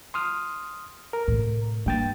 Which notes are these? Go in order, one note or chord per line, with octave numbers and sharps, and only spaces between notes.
C6 D#6 F6
A#4
A2 C3
G2 A#3 G5 A6